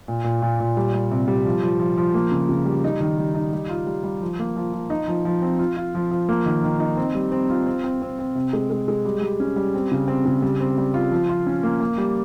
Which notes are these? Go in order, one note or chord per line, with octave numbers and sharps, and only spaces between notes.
A#2
A#2
A#2
A#2
G3
G3
C3
G3
F3
F3
F3
F3
A#3
C#3
C#3
G3
D#4
D#3
G3
D#4
G3
F4
G3
G3
F3
A#3
F3
F3
D#4
F3
F3
C4
F4
F4
F3
F3
A#3
D#3
D#3
D#4
C4
G3
C4
F4
C4
C4
C4
C4
C3
G#3
G#3
G#3
G3
G3
C#4
G3
C4
C#3
C4
C#3
G3
C4
G3
F4
F3
F4
C#4
A#3
A#3
G3